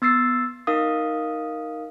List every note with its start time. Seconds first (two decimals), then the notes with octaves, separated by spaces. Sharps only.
0.02 B3 E6 A6 C7
0.67 D#4 A#4 F5 D#6